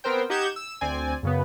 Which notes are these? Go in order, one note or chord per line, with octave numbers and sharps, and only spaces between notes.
B3 C4 A#4 C5 G5
D#4 G4 F#5 G6 G#6 E7
E6
D2 C4 D5 G#5
F#2 C#3 B3